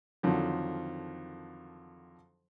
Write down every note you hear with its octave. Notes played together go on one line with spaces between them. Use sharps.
F2 D3 D#3 F3 F#3